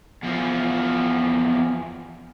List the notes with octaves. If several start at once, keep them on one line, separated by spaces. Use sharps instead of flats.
E2 F3